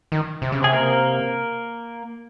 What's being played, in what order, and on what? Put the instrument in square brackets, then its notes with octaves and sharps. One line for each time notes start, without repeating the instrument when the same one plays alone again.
[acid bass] D#3
C3
C#3
[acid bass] C3 [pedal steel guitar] G#4
[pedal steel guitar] A#3 A#4